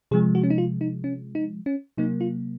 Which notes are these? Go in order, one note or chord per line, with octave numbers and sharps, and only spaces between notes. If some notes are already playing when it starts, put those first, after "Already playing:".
C3 F3 G#3 G#4
F#4
C#4
D#4
F4
D#4
C#4
D#4
C#4
C3 F#3 A#3 D#4
F4